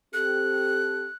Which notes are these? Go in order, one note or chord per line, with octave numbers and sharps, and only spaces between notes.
C4 G4 A4 F#6